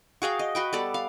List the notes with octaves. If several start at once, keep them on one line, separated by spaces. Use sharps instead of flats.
F#4 G#4 F5 G5
D#5
F#4 B4 G5
G3 B3 A4 D5
F5